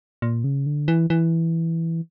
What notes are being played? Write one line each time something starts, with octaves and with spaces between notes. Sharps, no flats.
A#2
C#3
D3
E3
E3